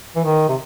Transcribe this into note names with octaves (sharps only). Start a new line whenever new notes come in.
E3
D#3
C3